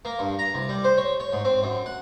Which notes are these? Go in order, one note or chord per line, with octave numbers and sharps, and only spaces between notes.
A#3
G2
A#5
C2
G3
C5
C#5
C#5
G#2
C4
F#2
F#5